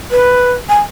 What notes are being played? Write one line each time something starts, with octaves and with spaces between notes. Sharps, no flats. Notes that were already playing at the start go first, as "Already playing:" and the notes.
B4
G#5